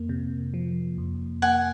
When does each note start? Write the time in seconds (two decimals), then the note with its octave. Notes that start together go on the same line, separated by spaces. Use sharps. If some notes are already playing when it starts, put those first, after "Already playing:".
Already playing: F2 A#3
0.09 C3
0.54 F3
0.98 F2
1.42 A#3 F#5 G#5